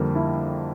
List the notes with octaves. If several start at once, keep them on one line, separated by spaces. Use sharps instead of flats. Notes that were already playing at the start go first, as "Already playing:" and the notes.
Already playing: F2 D3 G3 A#3
E4